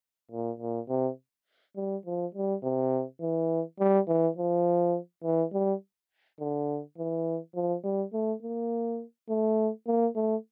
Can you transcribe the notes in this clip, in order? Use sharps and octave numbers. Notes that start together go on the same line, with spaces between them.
A#2
A#2
C3
G3
F3
G3
C3
E3
G3
E3
F3
E3
G3
D3
E3
F3
G3
A3
A#3
A3
A#3
A3